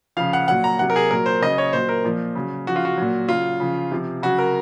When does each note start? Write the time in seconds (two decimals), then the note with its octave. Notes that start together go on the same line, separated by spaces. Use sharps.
0.17 C#3 F3 F5
0.33 F#5
0.48 A#2 F#3 F#5
0.64 A#5
0.79 C3 F#3 F#5
0.90 A#4
0.96 G#4
1.11 A#2 F#3 A#4
1.26 C5
1.41 C#3 F#3 D#5
1.58 C#5
1.73 A#2 F#3 C5
1.89 A#4
2.04 A#2 F3
2.35 C#3 F#3
2.67 C#3 F3 F#4
2.76 F4
2.85 F#4
2.98 A#2 F#3
3.29 C#3 F#3 F4
3.60 C#3 F3
3.92 C3 F3
4.22 C#3 F#3 F#4
4.39 A#4